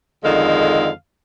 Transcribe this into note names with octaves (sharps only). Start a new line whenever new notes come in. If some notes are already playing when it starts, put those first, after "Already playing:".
F2 D3 D#3 G#3 F5